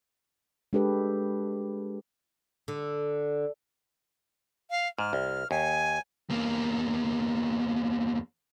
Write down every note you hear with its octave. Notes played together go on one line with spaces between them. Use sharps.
G#3 D4 G4 A4 B4
D3
F5
G#2 F6
C2
D#2 G#5
E2 A#3